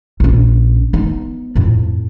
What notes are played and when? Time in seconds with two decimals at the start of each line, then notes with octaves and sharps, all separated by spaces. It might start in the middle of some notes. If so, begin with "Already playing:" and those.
0.20 A#1 C#4
0.93 B3 D#4
1.55 F2 A2